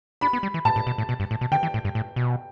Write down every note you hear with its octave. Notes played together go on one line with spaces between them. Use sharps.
D4 B5
B3
G3
E3
A2 A5
A2
B2
A2
B2
G2
A2
B2
D3 G5
E3
A2
G2
A2
B2